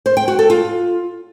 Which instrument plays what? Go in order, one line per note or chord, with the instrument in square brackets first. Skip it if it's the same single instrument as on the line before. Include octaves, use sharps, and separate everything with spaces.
[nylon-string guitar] C5
G5
F#4
A4
F4